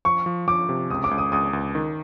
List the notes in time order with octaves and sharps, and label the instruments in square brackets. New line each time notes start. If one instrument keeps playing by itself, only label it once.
[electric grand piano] F3 [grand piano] C#6
[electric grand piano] F3
[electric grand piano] F3 [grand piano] D6
[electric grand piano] C3
[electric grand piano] C#2 [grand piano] D#6
[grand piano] D6
[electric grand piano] C#2
[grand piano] D#6
[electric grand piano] C#2 [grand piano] D#6
[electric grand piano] C#2
D#3